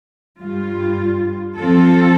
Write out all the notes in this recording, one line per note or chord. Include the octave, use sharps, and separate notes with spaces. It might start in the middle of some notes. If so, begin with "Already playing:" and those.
G2 G3 F4
F3 C4 F4 A4